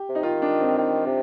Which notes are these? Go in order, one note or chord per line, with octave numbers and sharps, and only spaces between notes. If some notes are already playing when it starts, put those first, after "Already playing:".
Already playing: G4
C3
D#4
D#3 F4
D4
C4
D#3
C3